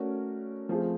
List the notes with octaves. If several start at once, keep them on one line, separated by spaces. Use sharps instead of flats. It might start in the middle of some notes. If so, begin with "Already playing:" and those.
Already playing: A3 C#4 F#4 A#4 D5
F3 A3 C4 F4 G#4